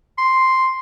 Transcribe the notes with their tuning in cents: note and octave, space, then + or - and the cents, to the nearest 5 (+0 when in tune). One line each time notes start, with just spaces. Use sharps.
C6 +0